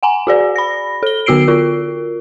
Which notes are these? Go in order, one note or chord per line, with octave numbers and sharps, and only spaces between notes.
F#5 G#5 A#5
F#4 G#4 D5
B5 A#6
A4 G7
D3 B3 F#4 E6 C7 D7
F4 A#4